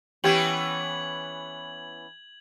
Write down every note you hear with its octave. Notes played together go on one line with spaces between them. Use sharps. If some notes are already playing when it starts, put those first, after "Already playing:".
E3 B3 C#4 G4 G#6 F#7